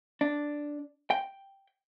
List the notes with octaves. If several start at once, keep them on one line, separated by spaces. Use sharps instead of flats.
D4
G5